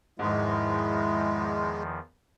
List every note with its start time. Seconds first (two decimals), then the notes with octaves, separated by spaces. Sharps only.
0.19 E2 G#2 D#3 F3 G#3 E4